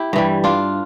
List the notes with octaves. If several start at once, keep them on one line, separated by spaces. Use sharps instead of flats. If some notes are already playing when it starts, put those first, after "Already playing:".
Already playing: E4 G4
G2 E3 G3
D4 F4